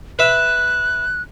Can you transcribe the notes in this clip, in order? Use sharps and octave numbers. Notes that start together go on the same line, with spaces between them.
B4 E5 F#6